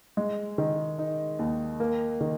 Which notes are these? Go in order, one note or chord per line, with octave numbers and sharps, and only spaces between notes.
G#3
D#3
D#4
D#2
A#3
D#3